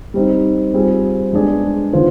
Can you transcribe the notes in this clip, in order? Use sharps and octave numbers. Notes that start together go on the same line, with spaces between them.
G3 C4 D#4
G3 C4 F4 G#4
G#3 B3 D4 G#4 D5
D#3 B3 F4 C5